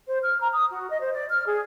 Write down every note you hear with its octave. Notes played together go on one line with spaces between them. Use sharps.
C5
F6
A#5
D#6
F#4
D#5
C5
D5
F6
G#4